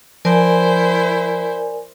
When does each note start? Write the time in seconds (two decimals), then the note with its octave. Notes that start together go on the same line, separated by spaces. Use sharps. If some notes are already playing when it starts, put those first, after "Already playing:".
0.25 F3 E4 A#4 C5 D5 G#5